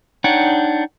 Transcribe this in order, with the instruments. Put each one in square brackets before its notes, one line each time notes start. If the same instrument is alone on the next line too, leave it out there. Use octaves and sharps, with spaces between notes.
[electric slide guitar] D4 D#4 C#5 F#5 G5